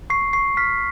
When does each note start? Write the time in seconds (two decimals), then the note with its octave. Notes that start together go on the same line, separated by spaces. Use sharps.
0.10 C#6 C7
0.33 C#6 C7
0.57 F6 B6